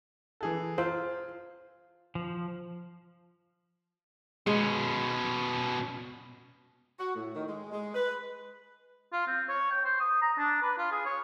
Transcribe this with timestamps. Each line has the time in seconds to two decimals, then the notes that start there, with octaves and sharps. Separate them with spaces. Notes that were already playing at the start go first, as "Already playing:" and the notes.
0.41 E3 G#4 A4
0.78 F4 C5
2.15 F3
4.47 B2 G#3 C#4
6.99 F#4
7.15 A2
7.35 D#3
7.48 G#3
7.71 G#3
7.95 B4
9.13 F4
9.27 C4
9.49 C#5
9.71 G5
9.85 C5
10.00 D#6
10.22 A#5
10.38 D4
10.63 B4
10.78 F4
10.92 G#4
11.05 C#5